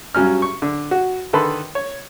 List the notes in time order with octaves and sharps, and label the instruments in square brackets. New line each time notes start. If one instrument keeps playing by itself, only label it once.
[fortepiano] G2 F#3 C#4 F6
C#6
D3
F#4
D3 D#3 A4 B4 B5 C6
C#5